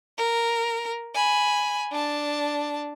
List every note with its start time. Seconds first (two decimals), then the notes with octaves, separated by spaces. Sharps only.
0.18 A#4
1.14 G#5 B5
1.91 D4 A5